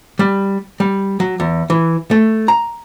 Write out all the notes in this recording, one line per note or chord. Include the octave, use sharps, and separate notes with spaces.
G3
G3
F#3
E2
E3
A3
A#5